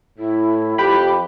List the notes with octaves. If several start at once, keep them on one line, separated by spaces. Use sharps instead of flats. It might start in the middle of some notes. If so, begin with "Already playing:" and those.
A2 E4
F2 G4 B4 G5 B5